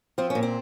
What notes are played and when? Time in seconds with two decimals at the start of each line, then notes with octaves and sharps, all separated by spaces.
0.18 F3 C4
0.30 C#4
0.35 A#2
0.43 C4